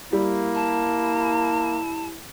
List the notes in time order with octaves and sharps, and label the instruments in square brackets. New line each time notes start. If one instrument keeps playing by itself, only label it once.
[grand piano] G3 [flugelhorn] A#3 [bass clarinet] E4
[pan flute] A5